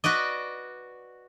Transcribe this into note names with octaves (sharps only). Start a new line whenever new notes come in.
F#4 B4 D5 D#5